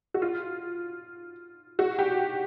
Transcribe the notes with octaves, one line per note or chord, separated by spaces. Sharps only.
F#4
F4
F#4
G4